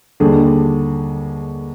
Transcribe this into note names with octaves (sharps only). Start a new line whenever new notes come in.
D#2 D3 G3 D4 G#4